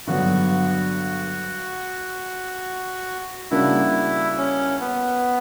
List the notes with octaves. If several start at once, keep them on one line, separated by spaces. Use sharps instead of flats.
G2 D3 F#3 B3 F#4
C#3 G3 A#3 D4 E4 F#4
C#4
B3